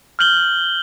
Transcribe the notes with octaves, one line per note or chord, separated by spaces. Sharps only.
F6 G6 F#7 G7